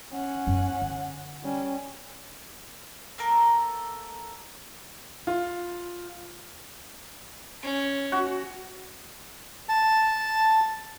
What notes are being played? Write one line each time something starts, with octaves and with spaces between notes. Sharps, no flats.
C#4 F#5
F#2 B3
D3
G3 C#4
A#3 A4 A#4
F4
C#4
F#4
A5